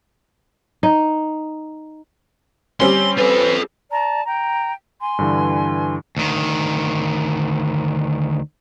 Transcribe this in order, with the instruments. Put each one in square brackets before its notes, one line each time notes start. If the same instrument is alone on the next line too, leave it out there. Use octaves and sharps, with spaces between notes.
[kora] D#4
[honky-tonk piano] G3 C4 C#4 [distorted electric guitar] C6
[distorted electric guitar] F4 A4 [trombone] B4
[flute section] D5 A5 A#5
G5 A#5
G#5 C6
[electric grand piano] G2 D3 E3
[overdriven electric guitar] D2 D#3